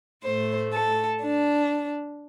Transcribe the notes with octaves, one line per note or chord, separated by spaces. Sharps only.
A2 A3 C5
A4
D4